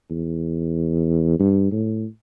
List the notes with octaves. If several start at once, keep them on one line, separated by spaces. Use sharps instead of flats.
E2
G2
A2